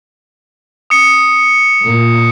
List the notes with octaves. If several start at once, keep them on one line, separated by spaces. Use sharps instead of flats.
D#6 C#7
A#2